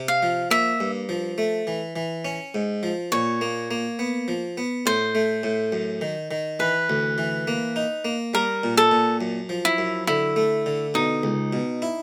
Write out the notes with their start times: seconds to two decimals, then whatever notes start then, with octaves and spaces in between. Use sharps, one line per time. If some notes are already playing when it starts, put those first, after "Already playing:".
Already playing: C3
0.08 F5
0.23 F3
0.51 A#3 E5
0.80 G2
1.09 F3
1.38 A3
1.67 E3
1.96 E3
2.25 C#4
2.55 G#2
2.83 F3
3.12 A#2 C#5
3.41 A#3
3.71 A#3
3.99 B3
4.28 F3
4.58 B3
4.86 A2 C5
5.15 A3
5.43 A2
5.72 F#2
6.01 D#3
6.31 D#3
6.60 E3 B4
6.90 D2
7.18 E3
7.47 A#3
7.76 D#4
8.05 A#3
8.34 G3 A#4
8.63 A#2
8.77 A4
8.91 A#2
9.21 F#2
9.49 F3
9.65 E4
9.78 F#2
10.07 D3 E4
10.36 A3
10.66 D3
10.94 B2 D#4
11.23 C#2
11.53 B2
11.82 E4